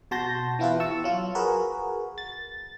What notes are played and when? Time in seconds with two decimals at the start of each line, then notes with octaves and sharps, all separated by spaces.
0.11 B2 F#4 A5 C6 G6 A#6
0.59 E3 B3 E4 F4 G4 B4
0.80 A5 C#6 E6
1.04 F#3 F4
1.35 F#4 G#4 A#4 B4
2.18 A6